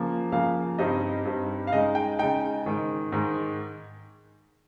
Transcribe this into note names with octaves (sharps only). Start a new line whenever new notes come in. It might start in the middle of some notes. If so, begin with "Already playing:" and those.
Already playing: C#3 F3 A#3
C#3 F3 A#3 F5
G2 G3 C4 D#4 D#5
G2 G3 C4 D#4
F5
C#3 G#3 D#4 D#5
G5
C#3 G#3 D#4 G5
G#2 D#3 G#3
G#2 D#3 G#3